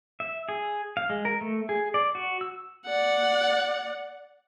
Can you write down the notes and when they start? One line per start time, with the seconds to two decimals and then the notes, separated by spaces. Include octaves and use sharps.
0.20 E5
0.49 G#4
0.97 F5
1.10 G#3
1.25 A#4
1.41 A3
1.69 G#4
1.94 D5
2.15 F#4
2.41 E6
2.86 D5 F#5